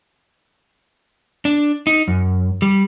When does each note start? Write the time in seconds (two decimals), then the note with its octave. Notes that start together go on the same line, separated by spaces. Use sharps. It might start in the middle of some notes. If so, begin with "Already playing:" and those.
1.45 D4
1.87 D#4
2.08 F#2
2.62 G3